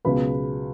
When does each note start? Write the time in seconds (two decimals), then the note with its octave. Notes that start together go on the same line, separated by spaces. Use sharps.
0.05 C#2 B2 F#3 B4 B5